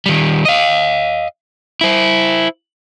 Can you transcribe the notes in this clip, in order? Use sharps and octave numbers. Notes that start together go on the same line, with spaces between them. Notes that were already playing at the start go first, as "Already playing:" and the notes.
D#3 G3
D#5 F5
E4 C5